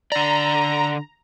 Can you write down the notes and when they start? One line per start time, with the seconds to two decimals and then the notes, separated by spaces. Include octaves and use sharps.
0.12 D3 D5 A#5